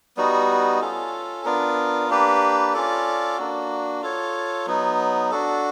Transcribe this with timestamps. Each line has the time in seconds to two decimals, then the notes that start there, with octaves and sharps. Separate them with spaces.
0.17 G3 B3 D#4 F#4
0.81 C#4 F4 A4
1.45 B3 D4 F4 A#4
2.10 A#3 D4 G4 B4
2.74 C#4 F4 A4 D5
3.38 A#3 D4 F#4
4.02 F4 A4 C#5
4.67 F#3 B3 D#4
5.31 D4 F#4 A4